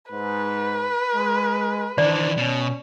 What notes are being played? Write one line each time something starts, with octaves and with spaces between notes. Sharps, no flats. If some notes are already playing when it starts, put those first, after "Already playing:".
G#2 B4
G#3
D#3 E3 D4 C5 D5
B2 C#4